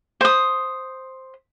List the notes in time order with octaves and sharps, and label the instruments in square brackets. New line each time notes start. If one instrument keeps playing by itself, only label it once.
[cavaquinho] C5 D#6